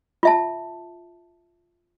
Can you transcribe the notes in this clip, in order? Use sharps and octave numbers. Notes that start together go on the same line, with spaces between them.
F4 E5 A5